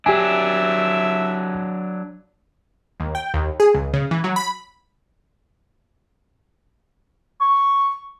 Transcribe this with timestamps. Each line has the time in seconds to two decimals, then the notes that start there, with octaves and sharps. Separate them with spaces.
0.06 F#3 D4 G4 E5 G#5
3.00 D#2
3.15 G5
3.34 D#2
3.60 G#4
3.74 C#2
3.94 C#3
4.11 E3
4.24 F#3
4.36 B5
7.41 C#6